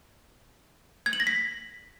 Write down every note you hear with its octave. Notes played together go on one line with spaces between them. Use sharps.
G#6
F#7
A#6
B6